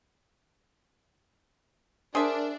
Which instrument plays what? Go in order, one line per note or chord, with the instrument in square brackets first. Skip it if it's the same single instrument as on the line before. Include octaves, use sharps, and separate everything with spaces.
[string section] D4 [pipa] G#4 C5 E5 [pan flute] A#4